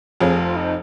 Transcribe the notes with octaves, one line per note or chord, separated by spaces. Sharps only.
F1 F2 F3 C4 G#4
F4
D#4